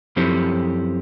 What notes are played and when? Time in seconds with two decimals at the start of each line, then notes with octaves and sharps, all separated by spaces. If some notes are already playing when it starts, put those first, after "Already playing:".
0.16 F#2 F3 C4 E4 G4 A4